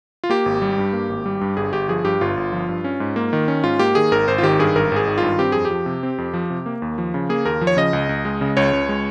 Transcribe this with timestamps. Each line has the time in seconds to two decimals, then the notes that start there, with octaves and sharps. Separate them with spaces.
0.24 F4
0.30 A#3 G4
0.46 G#1
0.62 G3
0.78 G2
0.93 A#3
1.09 G#1
1.26 G3
1.41 G2
1.57 G1 G#4
1.73 G1 G4
1.89 F3 G#4
2.05 G2 G4
2.21 G1 F4
2.37 G1
2.53 F3
2.69 G2
2.84 C#4
3.00 G#2
3.16 A#3
3.33 D#3
3.48 C#4
3.64 G#2 F4
3.79 A#3 G4
3.95 D#3 G#4
4.12 G#1 A#4
4.28 G#1 C5
4.38 F4
4.43 D#3 G4
4.59 G2 G#4
4.75 G#1 A#4
4.92 G#1 G#4
5.07 D#3
5.18 G2 F4
5.39 C4 G4
5.52 F2 G#4
5.65 G4
5.70 F3
5.86 C3
6.03 C4
6.18 F2
6.34 F3
6.50 C3
6.66 A#3
6.82 D#2
6.98 F3
7.14 C#3
7.29 A#3 G#4
7.45 D#2 A#4
7.61 F3
7.67 C#5
7.77 C#3 D#5
7.93 C#2
8.09 C#2
8.25 G#3
8.41 C#3
8.57 C#2 C#5
8.73 C#2
8.89 G#3